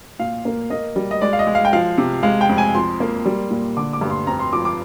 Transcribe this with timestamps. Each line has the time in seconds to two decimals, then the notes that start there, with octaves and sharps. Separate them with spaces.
0.19 A#2 F5
0.45 A#3
0.70 A#3 D#5
0.96 G3
1.11 D#5
1.21 G#3 D5
1.33 F5
1.39 D#5
1.47 G#3
1.55 F5
1.65 G5
1.73 F3 F5
1.98 C3
2.23 G#3 F5
2.41 G5
2.49 F2
2.58 G#5
2.74 F3 C6
3.00 A#3
3.26 G3
3.51 A#2
3.77 D3 D6
3.93 D6
4.01 G2
4.10 C6
4.27 F2 A#5
4.39 C6
4.53 F3 D6
4.65 D6